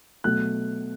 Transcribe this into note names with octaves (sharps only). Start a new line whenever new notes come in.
B2 F#3 A3 F#6